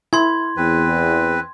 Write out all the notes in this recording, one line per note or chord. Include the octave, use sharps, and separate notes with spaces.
E4 C6 G#6
E2 C4 B4